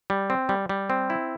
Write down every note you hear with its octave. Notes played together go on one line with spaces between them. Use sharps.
G3
C4
G3
G3
C4
E4